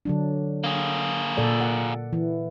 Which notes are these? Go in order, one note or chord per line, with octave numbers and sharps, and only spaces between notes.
D3 F#3 D4
A#3 G#4
A#2 A4 D5
F#5
E3